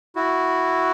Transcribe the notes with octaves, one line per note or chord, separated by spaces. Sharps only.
E4 F#4